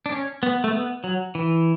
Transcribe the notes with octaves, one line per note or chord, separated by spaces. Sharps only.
D4
C#4
B3
A3
B3
F#3
E3